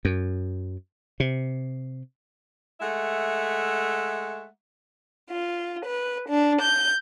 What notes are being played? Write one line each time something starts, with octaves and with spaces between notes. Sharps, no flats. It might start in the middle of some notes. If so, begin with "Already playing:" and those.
F#2
C3
G#3 A3 E5 F#5
F4
B4
D4
G6